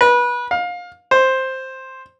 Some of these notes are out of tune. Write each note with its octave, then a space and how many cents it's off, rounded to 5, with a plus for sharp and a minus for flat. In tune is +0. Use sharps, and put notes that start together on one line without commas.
B4 -25
F5 +25
C5 +5